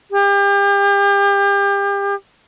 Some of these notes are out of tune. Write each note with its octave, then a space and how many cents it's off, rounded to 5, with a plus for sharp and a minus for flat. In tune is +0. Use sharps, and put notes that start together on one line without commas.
G4 +35